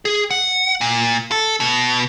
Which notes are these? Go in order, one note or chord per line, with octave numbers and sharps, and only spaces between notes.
G#4
F#5
A#2
A4
B2